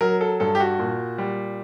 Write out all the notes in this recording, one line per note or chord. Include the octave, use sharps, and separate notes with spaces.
F#3 A#4
A4
G2 A4
G4
F#4
A#2
G3